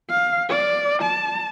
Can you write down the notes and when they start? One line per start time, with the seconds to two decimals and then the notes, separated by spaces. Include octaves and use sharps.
0.10 F5
0.50 D5
1.02 A5